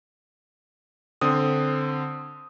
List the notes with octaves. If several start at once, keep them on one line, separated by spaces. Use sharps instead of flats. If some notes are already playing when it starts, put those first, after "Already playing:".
D3 C4 D#6